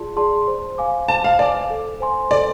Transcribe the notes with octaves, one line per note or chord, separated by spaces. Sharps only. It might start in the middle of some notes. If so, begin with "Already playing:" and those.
Already playing: F4 G#4 D5 A5 C6
G#4 D5 A5 C6
C5
F5 G#5 D6
C5 A5
F5
D5 F5 G#5 D6
A4
C5 G#5 C6
A4 D5